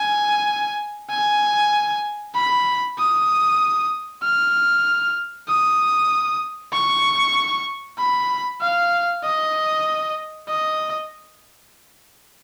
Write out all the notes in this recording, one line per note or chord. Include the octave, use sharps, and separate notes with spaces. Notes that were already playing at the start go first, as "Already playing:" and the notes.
Already playing: G#5
G#5
B5
D#6
F6
D#6
C#6
B5
F5
D#5
D#5